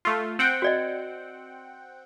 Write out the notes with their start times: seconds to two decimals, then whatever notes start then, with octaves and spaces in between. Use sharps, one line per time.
0.05 A3 F4
0.39 C4 F#5 G5
0.62 F#4 D5 D#5